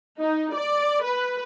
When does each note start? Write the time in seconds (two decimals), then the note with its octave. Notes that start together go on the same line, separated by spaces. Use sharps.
0.19 D#4
0.53 D5
1.03 B4